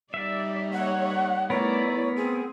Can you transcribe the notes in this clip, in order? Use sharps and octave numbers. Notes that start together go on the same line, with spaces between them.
G3 D#4 D5 E5
A#3 C#5 F#5
A3 B3 E4 A#4 C#5 D5
C4 G#4